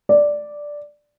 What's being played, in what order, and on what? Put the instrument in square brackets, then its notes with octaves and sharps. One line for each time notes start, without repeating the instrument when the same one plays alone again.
[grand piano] D5